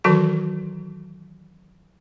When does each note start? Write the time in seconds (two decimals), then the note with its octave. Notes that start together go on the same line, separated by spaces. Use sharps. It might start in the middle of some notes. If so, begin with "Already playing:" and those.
0.04 D#3 E3 F#3 F#4 A4 A5